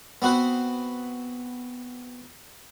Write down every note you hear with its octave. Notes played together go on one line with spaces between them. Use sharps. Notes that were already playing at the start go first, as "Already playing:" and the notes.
B3 C4 F#4 B4 C5